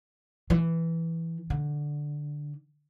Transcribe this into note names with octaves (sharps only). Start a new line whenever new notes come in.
E3
D3